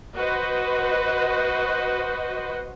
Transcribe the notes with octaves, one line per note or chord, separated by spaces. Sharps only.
F#4 B4 C5 D#5